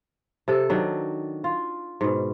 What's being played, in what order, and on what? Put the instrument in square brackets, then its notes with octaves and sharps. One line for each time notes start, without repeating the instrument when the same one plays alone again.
[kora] C3 A4
D#3 F#3 D4
F4
G#2 B2